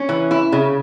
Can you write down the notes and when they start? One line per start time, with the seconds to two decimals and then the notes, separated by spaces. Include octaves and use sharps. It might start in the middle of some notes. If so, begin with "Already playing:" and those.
Already playing: C#4
0.09 E3
0.31 E4
0.52 C#3